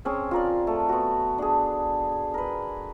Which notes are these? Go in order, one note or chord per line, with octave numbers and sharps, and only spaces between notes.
C4 C#4 G#4
F4 A#4 D5
A3
B3 F#4
D4 G#4
A#4 B4